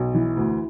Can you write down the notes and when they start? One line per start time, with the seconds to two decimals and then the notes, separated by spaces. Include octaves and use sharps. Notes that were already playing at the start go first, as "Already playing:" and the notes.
Already playing: B1
0.15 E3
0.37 D2